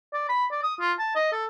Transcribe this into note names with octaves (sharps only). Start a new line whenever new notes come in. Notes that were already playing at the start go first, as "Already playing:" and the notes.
D5
B5
D5
D#6
F4
A5
D#5
A4